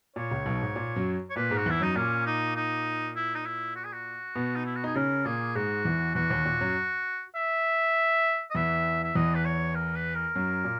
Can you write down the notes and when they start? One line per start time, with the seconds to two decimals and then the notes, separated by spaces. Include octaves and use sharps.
0.16 A#2 C#5
0.31 C#2 C#3
0.46 B1 B2
0.62 G#2
0.76 A#2
0.96 F#2 F#3
1.30 C#5
1.36 A#2 A#3 B4
1.50 G#2 G#3
1.57 F#4
1.66 E2 E3 E4
1.80 F#2 F#3 D#4
1.95 A#2 A#3 C#4
2.26 D#4
2.56 D#4
3.16 E4
3.35 D#4
3.46 E4
3.76 F#4
3.84 G#4
3.93 F#4
4.35 B2 B3
4.55 D#4
4.65 E4
4.75 F#4
4.84 D#4 G#4
4.95 C#3 C#4 A#4
5.25 A#2 A#3 G#4
5.55 G#2 G#3 F#4
5.85 E2 E3
6.15 E2 E3 F#4
6.30 D#2 D#3
6.46 A#2
6.61 F#2 F#3
7.35 E5
8.51 D#5
8.55 E2 E3 E5
9.04 E5
9.15 E2 E3 D#5
9.35 B4
9.45 C#5
9.75 A#4
9.95 B4
10.15 A#4
10.35 F#2 F#3
10.64 A#2